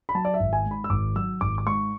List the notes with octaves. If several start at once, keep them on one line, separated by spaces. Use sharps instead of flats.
B5
F#3 A5
D5
E5
G#1
G#5
G#2
B5
E6
G#1 D6
F#3 E6
G#1 D6
D6
G#2 C#6